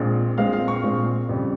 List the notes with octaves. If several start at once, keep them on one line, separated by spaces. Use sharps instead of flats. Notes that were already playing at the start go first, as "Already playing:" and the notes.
Already playing: A#1 A#2 G#3 C4
A#1 A#2 G#3 C4 F5
F5
C#6
A#1 A#2 G#3 C4
F2 C#3 G3